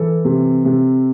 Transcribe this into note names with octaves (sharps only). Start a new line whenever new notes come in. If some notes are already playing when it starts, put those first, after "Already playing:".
Already playing: E3 A4
C3
C3